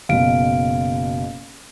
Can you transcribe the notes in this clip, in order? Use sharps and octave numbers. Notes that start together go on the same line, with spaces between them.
F#1 B2 F5 D7